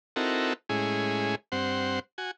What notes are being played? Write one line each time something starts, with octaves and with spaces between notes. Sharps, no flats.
C4 D#4 E4 F#4 A4 A#4
A2 G#3 C#4 E4 G#4
G2 C4 C5 F#5
F#4 G#5